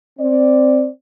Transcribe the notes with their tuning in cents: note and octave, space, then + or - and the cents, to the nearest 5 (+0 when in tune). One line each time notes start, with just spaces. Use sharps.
C4 +0 D5 +0